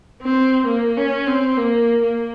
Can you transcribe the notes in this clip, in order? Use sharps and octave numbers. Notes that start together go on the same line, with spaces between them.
C4
A#3
C#4
C4
A#3
A#3